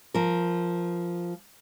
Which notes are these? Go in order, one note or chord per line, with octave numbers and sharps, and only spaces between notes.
F3 A#4